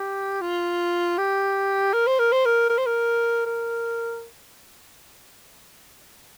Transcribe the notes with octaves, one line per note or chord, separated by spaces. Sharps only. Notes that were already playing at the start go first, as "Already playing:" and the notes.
Already playing: G4
F4
G4
A#4
C5
A#4
C5
A#4
A#4
C5
A#4
A#4